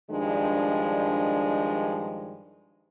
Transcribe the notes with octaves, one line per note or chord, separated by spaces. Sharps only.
G2 D#3 F3 G#3 D4